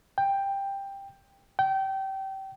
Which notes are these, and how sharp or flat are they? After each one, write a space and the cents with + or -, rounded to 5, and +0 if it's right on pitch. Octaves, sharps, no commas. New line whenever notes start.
G5 +10
G5 -25